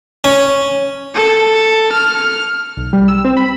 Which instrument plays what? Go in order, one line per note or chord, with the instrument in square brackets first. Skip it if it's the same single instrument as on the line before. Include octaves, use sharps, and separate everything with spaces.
[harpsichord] C#4
[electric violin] A4
F6
[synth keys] B1
G3
E6
C4
B5